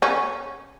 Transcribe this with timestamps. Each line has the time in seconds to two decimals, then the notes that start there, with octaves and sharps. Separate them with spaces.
0.02 C#4